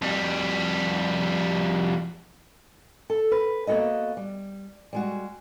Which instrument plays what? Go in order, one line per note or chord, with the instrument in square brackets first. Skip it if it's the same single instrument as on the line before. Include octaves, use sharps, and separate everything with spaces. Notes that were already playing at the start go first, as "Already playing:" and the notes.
[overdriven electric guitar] F2 G3
[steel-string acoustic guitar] A4
B4
A#3 B3 F#4 A4 D#5
G3
G3 G#3 F#4